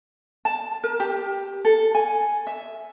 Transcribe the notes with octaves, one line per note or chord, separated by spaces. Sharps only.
A5
A#4
G4
A4
G#5
E5